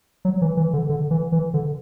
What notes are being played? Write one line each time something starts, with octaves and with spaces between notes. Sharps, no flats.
F#3
E3
E3
D3
D3
E3
E3
D3